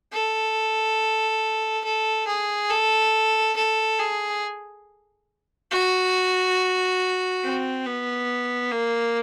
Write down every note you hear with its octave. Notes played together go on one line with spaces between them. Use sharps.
A4
A4
G#4
A4
A4
G#4
F#4
C4
B3
A#3